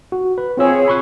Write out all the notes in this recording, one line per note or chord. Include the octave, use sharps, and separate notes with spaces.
F#4
B4
C4 F4 G#4 C#5 E6
B5 C#6 F#6